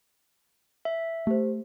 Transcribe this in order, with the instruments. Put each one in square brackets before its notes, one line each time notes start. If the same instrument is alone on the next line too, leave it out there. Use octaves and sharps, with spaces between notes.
[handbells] E5
[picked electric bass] A3 [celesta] G4 C5